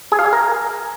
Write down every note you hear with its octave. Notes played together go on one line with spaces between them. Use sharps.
G#4
F5
G#5
A#4